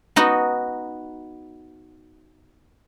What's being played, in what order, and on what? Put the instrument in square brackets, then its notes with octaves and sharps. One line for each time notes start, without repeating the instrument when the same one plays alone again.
[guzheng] B3 D#4 F#4